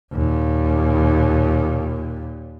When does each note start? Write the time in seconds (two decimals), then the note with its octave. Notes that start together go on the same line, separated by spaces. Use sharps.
0.13 D#2 A#2